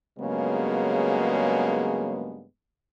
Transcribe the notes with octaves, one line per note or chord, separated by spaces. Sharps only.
G2 C#3 F#3 G#3 A#3 B3